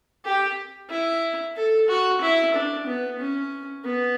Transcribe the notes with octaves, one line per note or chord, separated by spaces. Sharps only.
G4
E4
A4
F#4
E4
D4
B3
C#4
B3